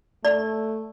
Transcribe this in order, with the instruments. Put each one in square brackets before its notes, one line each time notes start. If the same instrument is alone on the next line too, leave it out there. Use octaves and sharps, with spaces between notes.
[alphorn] A3 [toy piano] D5